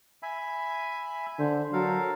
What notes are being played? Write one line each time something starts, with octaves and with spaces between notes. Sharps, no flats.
E5 G#5 B5
D3 C5
F#3 A4 A#4 F5